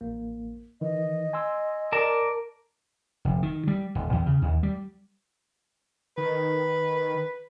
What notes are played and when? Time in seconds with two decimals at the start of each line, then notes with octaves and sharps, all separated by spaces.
0.01 A1 A#3
0.81 D#3 E3 D#5
1.33 G#5 C6 E6
1.92 A#4 D5 A5
3.25 F1
3.43 D#3
3.68 G3
3.95 D#1
4.13 E2
4.26 C#3
4.42 D#2
4.63 G3
6.18 D#3 B4